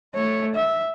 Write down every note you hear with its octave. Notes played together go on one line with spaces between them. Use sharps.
A3 C#5
E5